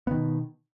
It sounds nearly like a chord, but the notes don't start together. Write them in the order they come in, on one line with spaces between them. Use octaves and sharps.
B3 D#3 B2